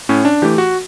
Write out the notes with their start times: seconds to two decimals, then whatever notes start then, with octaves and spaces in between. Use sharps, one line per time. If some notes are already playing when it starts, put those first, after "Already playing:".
0.09 A2 C#4
0.25 D4
0.42 E3 A3 G4
0.58 F#4